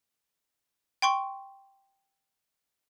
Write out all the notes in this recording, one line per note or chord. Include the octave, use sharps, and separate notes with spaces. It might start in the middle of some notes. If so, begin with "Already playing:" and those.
G5 C6 C#6